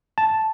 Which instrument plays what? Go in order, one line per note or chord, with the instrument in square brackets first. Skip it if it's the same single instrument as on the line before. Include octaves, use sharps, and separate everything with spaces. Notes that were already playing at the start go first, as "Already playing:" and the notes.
[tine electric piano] A5